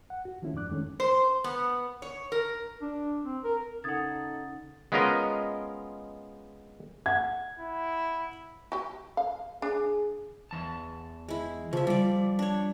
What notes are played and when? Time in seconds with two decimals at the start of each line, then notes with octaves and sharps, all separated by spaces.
0.10 F#5
0.25 F#4
0.42 D#3 F3 A3 C#4 E4
0.54 F2 G#2 D4 D6 F#6
0.70 D#3 G#3 A3 C#4
1.00 C5
1.44 B3
2.02 C#5
2.32 A#4
2.81 D4
3.24 C4
3.44 A#4
3.84 C#3 D#4 A4 F#5 D#6 G#6 A6
4.92 G#3 B3 C#4 F4 A#4 D#5
7.06 F#5 G#6
7.59 E4
8.72 F#4 G4
9.17 F5
9.62 D4 G#4
10.51 E2 A5
11.28 G#3 E4
11.73 C#3 F3 E5
11.87 F3 G3 D5
12.39 D4 C#5